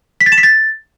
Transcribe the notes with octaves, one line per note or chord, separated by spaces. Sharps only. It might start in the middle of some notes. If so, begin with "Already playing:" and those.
B6
A6
E7
B6
A6